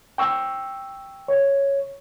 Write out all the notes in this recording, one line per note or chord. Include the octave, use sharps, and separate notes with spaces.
G5 C#6 E6
C#5